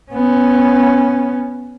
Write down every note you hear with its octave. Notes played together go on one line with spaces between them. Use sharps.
B3 C#4